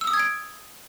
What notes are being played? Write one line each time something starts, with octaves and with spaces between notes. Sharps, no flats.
E6
D#6
G#6
D7